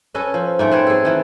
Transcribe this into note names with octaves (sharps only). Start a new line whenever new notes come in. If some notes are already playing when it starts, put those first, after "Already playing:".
C#4 A4 B4 D#5
F3
G#2 A3 G5
C4 B4 C#5
G#4 A4
D#3 E3